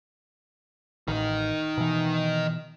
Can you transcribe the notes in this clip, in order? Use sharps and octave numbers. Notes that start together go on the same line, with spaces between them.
A1 D#3 D#4
B2 E3